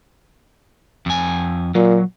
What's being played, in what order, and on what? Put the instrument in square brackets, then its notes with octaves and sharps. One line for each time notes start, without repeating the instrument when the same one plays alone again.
[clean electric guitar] F2 G#5
[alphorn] A#2 [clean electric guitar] F#3